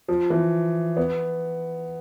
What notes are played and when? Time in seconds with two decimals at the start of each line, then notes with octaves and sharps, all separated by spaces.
0.08 F3
0.30 E3
0.97 B3